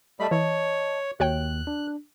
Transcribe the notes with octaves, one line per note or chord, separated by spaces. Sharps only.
G3 A3 D#5 A5 B5
E3 C#5
D#2 F#4 C#5 G5 F#6
D4